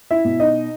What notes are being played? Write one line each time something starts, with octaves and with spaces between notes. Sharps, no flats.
E4 E5
B2
D#4 D#5